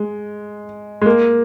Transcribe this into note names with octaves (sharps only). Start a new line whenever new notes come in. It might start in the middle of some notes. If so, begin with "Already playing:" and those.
Already playing: G#3
G#3
A#3